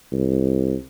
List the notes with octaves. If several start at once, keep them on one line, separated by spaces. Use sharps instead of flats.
C2